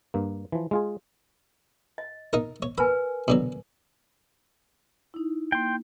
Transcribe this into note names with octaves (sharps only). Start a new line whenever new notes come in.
G2 A#3
E3 F3
G#3 F4 G#4
D#5
D#4 A#4
C#5
A#4 B4 G#5 B5
B2 D3 F#3
D#4 E4
A#3 G5 C6